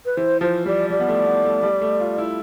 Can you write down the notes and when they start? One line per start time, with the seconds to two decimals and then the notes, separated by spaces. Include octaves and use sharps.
0.05 B4
0.17 E3 C5
0.41 F3 C5
0.66 G3 D5
0.90 G3 D5
1.00 B3
1.08 A3
1.26 B3
1.45 A3
1.63 G3
1.81 A3
2.00 F4
2.18 E4